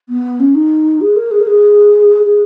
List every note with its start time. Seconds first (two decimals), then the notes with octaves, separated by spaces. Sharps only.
0.09 B3
0.40 C#4
0.55 D#4
1.01 G#4
1.16 A#4
1.31 G#4
1.40 A#4
1.47 G#4
2.24 G#4